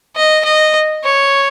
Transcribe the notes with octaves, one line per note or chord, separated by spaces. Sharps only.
D#5
D#5
C#5